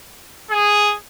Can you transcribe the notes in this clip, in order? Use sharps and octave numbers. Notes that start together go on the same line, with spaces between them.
G#4